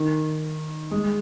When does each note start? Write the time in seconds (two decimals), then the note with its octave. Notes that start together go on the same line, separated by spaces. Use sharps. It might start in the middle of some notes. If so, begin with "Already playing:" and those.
Already playing: D#3
0.91 G#3